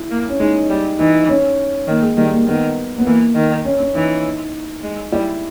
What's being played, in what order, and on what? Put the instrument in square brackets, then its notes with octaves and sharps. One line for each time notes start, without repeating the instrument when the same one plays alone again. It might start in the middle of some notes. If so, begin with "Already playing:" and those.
Already playing: [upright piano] E4
[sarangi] A#3
[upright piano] C#4
[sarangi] G#3 [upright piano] D#4
[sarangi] G3
[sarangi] E3 [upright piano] D#4
[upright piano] C#4
[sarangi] D#3 [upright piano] A#3
[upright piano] G#3
[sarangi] D#3 [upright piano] G3
[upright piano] A#3
[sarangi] D#3 [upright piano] B3
[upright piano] B3
[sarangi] E3 [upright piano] A#3
[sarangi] D#3
[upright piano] C#4
C#4
[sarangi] E3 [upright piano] D#4
[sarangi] G#3
[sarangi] G3 [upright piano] E4